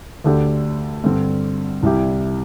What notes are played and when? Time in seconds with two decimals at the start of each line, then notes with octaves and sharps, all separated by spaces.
0.24 D2 D3 A3 D4 G4
1.04 G2 D3 C4
1.83 C2 C3 G3 E4 G4